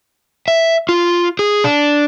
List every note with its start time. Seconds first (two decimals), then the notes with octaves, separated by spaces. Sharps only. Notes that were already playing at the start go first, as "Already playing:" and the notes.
0.48 E5
0.89 F4
1.39 G#4
1.64 D4